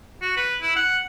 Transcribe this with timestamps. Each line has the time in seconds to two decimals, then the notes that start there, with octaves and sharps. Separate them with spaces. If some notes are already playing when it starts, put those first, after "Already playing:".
0.22 F#4
0.37 B4
0.62 E4
0.76 F#5